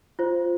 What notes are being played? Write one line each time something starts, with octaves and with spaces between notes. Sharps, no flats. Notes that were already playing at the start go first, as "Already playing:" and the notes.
F4 C5